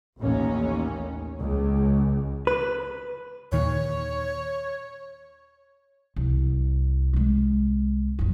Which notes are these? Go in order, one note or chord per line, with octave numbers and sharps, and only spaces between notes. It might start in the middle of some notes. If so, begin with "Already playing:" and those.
A1 D#2 C#4
C#2
B4
D#2 A#2 D#3 C#5
C2
C2 G#3
A#1 F#2